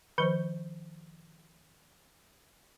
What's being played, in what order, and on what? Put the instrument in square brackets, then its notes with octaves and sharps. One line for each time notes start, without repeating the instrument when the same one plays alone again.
[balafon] D#3 F3 C5 [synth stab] B4 C#6 G6